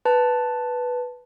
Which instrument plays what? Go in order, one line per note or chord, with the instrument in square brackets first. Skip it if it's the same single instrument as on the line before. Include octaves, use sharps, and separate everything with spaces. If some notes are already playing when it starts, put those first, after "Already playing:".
[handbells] B4 A5